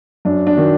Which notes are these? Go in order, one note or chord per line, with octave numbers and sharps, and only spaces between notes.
F#2 D4
D4
D#3 F#3